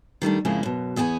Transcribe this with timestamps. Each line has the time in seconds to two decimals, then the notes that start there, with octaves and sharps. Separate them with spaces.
0.22 D#3 G3 A3 D4
0.45 F2 C#3 G#3 A#3 E4
0.63 F#2 B2
0.96 E2 B3 G#4 G5 G#5